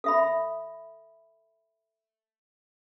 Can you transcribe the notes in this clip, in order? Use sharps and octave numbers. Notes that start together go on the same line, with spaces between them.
A4 E5 B5